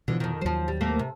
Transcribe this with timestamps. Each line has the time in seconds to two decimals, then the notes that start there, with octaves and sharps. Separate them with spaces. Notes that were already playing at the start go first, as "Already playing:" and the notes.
0.08 B2 D3 E3 F3
0.20 F2 D#3
0.41 D#2 F3 F#3 C5
0.68 G3
0.81 A3 A#3 C4
0.99 C3